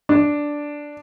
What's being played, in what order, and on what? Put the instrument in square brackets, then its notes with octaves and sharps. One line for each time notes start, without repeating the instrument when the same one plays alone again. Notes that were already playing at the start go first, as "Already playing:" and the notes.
[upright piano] D4